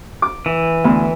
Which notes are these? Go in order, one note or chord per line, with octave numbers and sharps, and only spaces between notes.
D6
E3
D2 B3